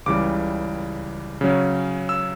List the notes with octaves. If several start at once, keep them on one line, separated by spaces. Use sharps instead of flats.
C#2 C#3 E3 G3 D6
C#3 F#3 C#4
E6